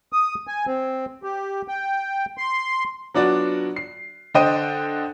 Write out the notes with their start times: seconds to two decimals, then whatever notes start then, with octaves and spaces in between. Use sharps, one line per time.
0.13 D#6
0.47 G#5
0.67 C4
1.23 G4
1.68 G5
2.38 C6
3.14 F#3 B3 D4 F4 F#4 D5
3.76 C7
4.34 D3 D4 C5 D#5 G5 D#7